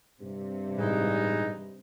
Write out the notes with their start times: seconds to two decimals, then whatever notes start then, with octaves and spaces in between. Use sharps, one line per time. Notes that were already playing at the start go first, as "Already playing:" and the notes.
0.21 G2 C3
0.78 A2 E3 G#3 D#4